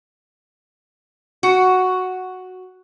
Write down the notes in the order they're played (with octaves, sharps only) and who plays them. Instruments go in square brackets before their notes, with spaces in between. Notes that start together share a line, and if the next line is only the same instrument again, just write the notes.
[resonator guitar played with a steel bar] F#4